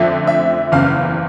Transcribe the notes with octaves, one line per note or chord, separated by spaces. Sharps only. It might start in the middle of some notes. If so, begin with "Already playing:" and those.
Already playing: F2 D3 F3 A3 C4 E5
E5
F#1 E2 C#3 F5